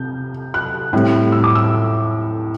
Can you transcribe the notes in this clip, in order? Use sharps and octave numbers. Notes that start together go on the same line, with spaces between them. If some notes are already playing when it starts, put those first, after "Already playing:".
Already playing: C3 G6
F#6
A2 G3 C4
E6
D6
E6